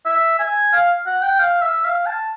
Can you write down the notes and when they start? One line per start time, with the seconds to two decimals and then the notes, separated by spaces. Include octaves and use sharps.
0.06 E5
0.39 G#5
0.73 F5
1.06 F#5
1.22 G5
1.39 F5
1.62 E5
1.84 F5
2.06 A5